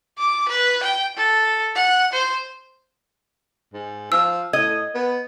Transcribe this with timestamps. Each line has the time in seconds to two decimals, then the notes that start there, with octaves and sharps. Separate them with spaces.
0.18 D6
0.49 B4
0.83 G5
1.17 A4
1.75 F#5
2.13 C5
3.74 G#2
4.12 F3 E6
4.53 A2 D#5 G#6
4.94 B3